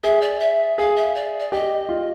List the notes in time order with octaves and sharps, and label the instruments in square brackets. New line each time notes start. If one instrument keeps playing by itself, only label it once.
[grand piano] G#4 [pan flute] E5
[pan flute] D5
E5
[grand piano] G#4 [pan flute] F5
[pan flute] E5
D5
D5
[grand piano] G4 [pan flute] D#5
[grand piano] F4